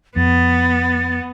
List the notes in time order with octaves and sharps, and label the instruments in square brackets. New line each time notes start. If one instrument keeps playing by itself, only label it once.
[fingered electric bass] F2 [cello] B3 [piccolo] A6